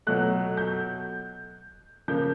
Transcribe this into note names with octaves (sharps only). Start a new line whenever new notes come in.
B2 F#3 A3 F#6
G6
C#3 F3 A#3 G6